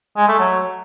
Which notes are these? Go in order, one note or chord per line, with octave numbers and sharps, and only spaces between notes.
G#3
A3
F#3